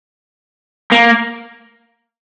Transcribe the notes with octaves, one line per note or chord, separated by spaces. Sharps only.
A#3